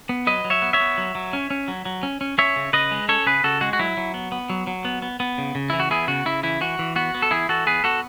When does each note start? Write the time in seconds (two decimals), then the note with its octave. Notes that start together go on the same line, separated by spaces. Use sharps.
0.09 B3
0.27 F#3 B4 D#5
0.45 F#3
0.50 C#5 E5
0.62 B3
0.73 C#5 E5
0.80 B3
0.98 F#3
1.15 F#3
1.33 C#4
1.50 C#4
1.68 F#3
1.85 F#3
2.03 C#4
2.21 C#4
2.38 C#4 C#5 E5
2.56 C#3
2.73 C#3 B4 D#5
2.91 G#3
3.08 C#4 A4 C#5
3.26 C#3 G#4 B4
3.44 C#3 F#4 A4
3.61 G#3 F#4
3.73 F#4
3.79 F#3 E4
3.97 F#3
4.14 B3
4.32 B3
4.50 F#3
4.67 F#3
4.85 B3
5.02 B3
5.20 B3
5.38 C#3
5.55 C#3
5.70 E3 E4
5.80 F#4
5.90 B3 E4 G#4
6.08 C#3 F#4
6.26 C#3 E4
6.43 E3 E4
6.61 E3 F#4
6.79 E3
6.96 B3 F#4
7.14 B3
7.22 A4
7.31 E3 E4 G#4
7.49 E3 F#4 A4
7.66 B3 G#4 B4
7.84 B3 F#4 A4